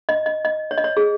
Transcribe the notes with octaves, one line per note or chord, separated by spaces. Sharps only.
D#5
D#5
D#5
C#5
D#5
C#5
G#4